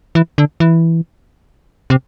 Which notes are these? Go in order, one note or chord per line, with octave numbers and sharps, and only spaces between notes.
E3
D3
E3
C3